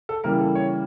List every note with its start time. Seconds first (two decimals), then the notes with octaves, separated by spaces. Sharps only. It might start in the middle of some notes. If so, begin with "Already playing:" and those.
0.09 A4
0.24 C#3 E3 G3 A#3 A#4
0.40 A4
0.55 C#5